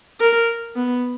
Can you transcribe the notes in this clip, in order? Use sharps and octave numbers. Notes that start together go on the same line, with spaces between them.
A#4
B3